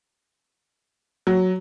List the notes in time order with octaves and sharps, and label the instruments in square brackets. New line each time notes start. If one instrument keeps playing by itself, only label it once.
[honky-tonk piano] F#3